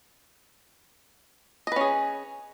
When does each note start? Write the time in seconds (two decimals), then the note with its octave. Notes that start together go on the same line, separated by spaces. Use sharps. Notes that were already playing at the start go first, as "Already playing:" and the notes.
1.67 D#5
1.72 B4
1.76 C#4
1.81 G#4